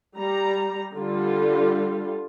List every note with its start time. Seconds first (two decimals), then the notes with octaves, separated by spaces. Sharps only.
0.17 G3 A#5
0.96 D3 G3 F4